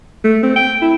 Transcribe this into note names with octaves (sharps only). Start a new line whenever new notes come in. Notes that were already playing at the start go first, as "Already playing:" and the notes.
A3
C4
G5
E4